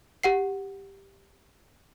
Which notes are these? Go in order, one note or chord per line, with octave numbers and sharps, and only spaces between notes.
G4 F#5 C7